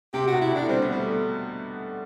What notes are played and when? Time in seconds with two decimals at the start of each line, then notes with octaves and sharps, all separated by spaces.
0.14 C3 G4
0.27 B2 F#4
0.41 E4
0.51 D3 D4
0.69 G3 C4
0.82 B3
0.92 G3
0.97 A3